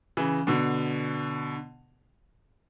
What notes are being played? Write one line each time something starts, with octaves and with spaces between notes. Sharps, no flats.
C#3 E3
B2 D3